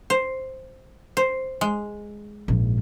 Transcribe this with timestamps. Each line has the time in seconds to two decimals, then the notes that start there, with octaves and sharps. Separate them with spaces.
0.10 C5
1.17 C5
1.61 G#3
2.48 A#1 G#2